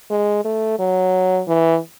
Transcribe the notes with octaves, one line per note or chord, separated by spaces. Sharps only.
G#3
A3
F#3
E3